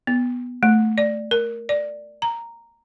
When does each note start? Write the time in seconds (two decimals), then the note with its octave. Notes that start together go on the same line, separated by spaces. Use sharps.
0.07 B3
0.63 A3
0.98 D5
1.31 A#4
1.69 D5
2.22 A#5